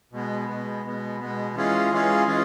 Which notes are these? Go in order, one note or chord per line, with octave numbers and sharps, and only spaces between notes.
B2 G#3 B3
B2 G#3 B3
B2 G#3 B3
B2 G#3 B3
E3 G#3 C#4 F4 G#4
E3 G#3 C#4 F4 G#4
E3 G#3 C#4 F4 G#4